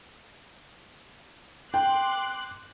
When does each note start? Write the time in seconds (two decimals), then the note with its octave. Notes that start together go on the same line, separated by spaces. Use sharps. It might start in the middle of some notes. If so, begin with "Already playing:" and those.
1.74 G5 C6 D6 F#6